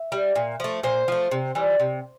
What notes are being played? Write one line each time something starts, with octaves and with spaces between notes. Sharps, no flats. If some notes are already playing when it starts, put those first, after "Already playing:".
Already playing: E5
G3
A#2
F3 A3
A#2 C5
F3 A3
C3
E3 G3
C3